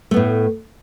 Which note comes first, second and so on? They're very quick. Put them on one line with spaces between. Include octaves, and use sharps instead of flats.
A3 B3 A2